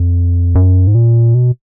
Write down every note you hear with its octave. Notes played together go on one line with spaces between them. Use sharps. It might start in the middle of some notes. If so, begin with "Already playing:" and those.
Already playing: F2
F#2
G#2
A#2
B2